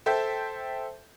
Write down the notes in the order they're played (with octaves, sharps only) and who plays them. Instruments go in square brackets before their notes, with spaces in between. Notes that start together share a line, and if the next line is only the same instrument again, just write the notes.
[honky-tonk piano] A4 C5 E5 G5 A5 G6